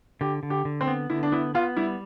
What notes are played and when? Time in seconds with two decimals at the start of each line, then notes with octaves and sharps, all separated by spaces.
0.21 D3 G4
0.43 D3
0.50 G4
0.65 D3
0.81 C4
0.87 B3
1.10 D3 E4
1.23 D4
1.32 B3 E4
1.55 B3 F4
1.77 G3 E4